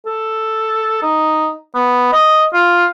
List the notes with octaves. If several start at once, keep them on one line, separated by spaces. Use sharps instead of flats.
A4
D#4
B3
D#5
F4